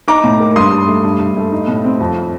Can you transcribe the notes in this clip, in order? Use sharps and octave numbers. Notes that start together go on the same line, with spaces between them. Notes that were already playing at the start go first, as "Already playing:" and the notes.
D#4 A#5 D6
A2
A#3
G2 C6 D#6
G2
A3
G2
G2
A3
D#4
A2
C4
F2